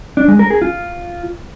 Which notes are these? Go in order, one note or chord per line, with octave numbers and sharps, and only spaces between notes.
D4
G#3
A#4
G#4
F4